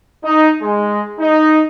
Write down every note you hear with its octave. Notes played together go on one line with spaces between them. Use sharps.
D#4
G#3
D#4